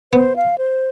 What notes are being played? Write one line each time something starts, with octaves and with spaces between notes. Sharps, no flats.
B3 C5
F5
C5